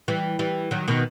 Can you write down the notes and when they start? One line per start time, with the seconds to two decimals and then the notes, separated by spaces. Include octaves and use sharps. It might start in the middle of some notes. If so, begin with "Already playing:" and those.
0.08 E3 G3
0.39 E3 G3
0.71 D#3 F#3
0.88 B2 D#3